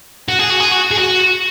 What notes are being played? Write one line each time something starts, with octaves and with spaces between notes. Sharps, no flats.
F#4
G#4
F#4
G#4
F#4
G#4
F#4